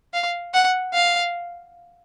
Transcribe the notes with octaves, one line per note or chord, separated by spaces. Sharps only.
F5
F#5
F5